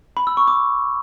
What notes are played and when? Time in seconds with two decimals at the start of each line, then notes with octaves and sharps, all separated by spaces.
0.17 B5
0.27 E6
0.37 C#6
0.47 D6